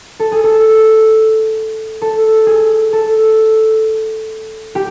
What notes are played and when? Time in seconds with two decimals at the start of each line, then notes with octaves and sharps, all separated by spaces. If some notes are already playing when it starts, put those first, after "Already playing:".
0.20 A4
0.32 G#4
0.44 A4
2.02 A4
2.46 G#4
2.93 A4
4.75 G4